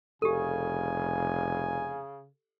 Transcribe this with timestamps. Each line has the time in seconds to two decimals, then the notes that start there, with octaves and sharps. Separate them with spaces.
0.22 F1 C#3 G4 A4 G#5